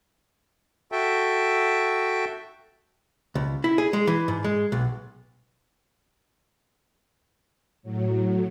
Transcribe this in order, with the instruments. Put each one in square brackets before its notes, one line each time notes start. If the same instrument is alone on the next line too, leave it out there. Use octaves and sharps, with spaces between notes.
[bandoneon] F#4 A4 E5 G5
[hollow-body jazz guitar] C#2
E4
G#4
G#3
E3
G#2
G#3
B1
[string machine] A2 F#3